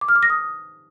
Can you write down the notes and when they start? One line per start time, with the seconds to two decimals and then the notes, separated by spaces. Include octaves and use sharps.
0.01 D6
0.08 F6
0.16 D6
0.23 A#6
0.30 D#6